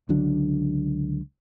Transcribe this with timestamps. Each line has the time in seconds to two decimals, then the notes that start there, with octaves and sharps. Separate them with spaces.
0.09 C#2 D3 F#3 D4